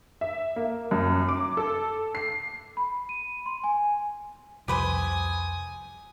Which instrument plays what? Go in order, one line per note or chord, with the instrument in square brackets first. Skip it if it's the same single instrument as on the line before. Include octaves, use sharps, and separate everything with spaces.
[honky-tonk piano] E5
A#3
F#2
D6
A4
C7
[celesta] B5
D#7
C6
G#5
[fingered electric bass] C2 F2 [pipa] G4 B4 C5 [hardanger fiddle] G#5 D#6